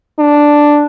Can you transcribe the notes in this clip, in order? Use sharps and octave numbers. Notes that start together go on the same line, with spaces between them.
D4